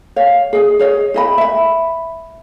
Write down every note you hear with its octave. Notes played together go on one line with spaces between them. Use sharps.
C#5 F5
G#4 D#5
G#4 C#5 D#5
E4 D#5 B5
E5 B5